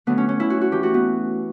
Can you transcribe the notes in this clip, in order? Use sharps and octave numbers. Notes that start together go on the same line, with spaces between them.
D3 F#3 A3 B3
C#4
C#4
E4
F#4
F#4
A2 E3 A3 G4
F#4
B3